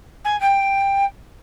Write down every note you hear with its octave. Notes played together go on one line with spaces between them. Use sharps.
G#5
G5